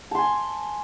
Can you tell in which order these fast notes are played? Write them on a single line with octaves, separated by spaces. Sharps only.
A5 C6 G#5